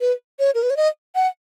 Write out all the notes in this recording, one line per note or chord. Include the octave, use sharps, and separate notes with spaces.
B4
C#5
A#4
B4
C#5
D#5
F#5